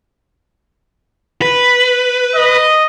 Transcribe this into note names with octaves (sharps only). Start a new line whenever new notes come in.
B4
D#5